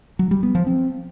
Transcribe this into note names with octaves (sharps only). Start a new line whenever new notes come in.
F#3
G3
B3
F3
C4